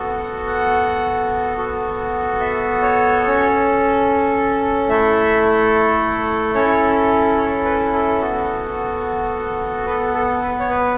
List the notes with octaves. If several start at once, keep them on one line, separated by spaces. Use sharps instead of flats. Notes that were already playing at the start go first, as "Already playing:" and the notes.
Already playing: B3 F#4 A4
F#5
F#5
B3 F#4 A4
E5
C#5
C#4 A4
A3 E4 A4 E5
C#4 E4 A4 C#5
C#5
B4
A4
B3 F#4 A4
B3 A4 B4
A4
B4
C#5
B4